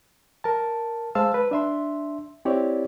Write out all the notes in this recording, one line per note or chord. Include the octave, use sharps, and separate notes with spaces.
A#4 A5
G#3 C5 F5 A5 E6
B4
D4 E5 C6
C4 E4 G4 C#5 D5